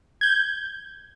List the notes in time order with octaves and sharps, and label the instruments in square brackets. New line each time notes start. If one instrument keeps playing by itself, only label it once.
[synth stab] G6 G#6